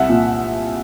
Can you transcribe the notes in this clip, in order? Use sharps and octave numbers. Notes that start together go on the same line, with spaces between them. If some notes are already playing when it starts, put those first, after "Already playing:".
Already playing: C2 E5 F#5
A#2